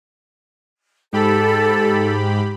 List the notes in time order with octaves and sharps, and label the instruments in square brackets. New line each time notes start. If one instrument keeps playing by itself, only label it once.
[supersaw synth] G#2 G4 B5 [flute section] A4